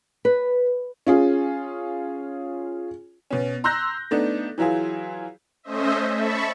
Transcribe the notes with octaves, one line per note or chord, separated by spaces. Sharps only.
B4
C#4 F4 G#4
B2 C#4
A#5 C6 E6 F#6 G6 A#6
A3 B3 D4 D#4
E3 F#3 E4 F4 G#4
A3 C#4 C5 D#5 E5
E5 A5 B5 C#6